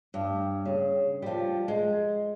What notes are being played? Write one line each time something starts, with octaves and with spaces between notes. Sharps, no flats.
G2
C#3
F3 G3
G#3